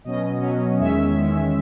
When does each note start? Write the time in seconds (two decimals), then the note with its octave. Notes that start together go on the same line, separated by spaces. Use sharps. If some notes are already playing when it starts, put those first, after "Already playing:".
0.04 B2 F#3 C#4 D#5
0.41 B2 F#3 C#4
0.79 E2 D#3 G#3 C#4 E5
1.16 E2 D#3 G#3 C#4